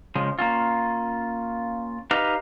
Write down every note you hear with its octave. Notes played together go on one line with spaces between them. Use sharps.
C#3 F3 G#3
A#3 C#4 F4
D#4 G4 B4 D#5 F5